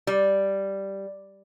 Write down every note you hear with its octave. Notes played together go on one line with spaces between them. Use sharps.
G3